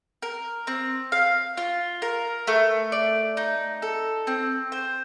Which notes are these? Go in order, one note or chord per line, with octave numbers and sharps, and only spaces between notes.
A#4
C4
F5
F4
A#4
A3
D5
D#4
A4
C4
C5